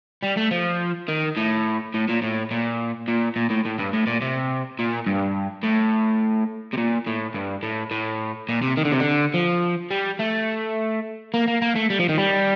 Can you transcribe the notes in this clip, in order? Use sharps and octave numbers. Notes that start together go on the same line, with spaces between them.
G3
A3
F3
D#3
A2
A2
A#2
A2
A#2
A#2
A#2
A2
A2
G2
A2
A#2
C3
A#2
G2
A2
C3
A#2
A2
G2
A2
A2
A#2
C3
D#3
D3
C3
D3
F3
G3
A3
A#3
A#3
A#3
A3
G3
F3
D#3
G3